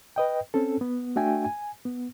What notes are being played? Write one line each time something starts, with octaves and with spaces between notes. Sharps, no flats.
B4 D#5 G5
C4 C#4 A4
B3
A3 D4 F#4 E5 G5 G#5
G#5
B3